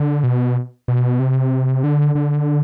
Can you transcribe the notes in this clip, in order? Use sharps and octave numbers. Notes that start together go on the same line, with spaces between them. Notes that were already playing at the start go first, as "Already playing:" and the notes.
Already playing: D3
B2
B2
C3
D3
D3